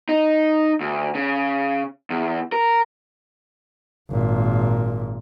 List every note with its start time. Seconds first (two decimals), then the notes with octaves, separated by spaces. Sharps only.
0.09 D#4
0.80 D2
1.15 C#3
2.10 E2
2.52 A#4
4.11 G#1 A#2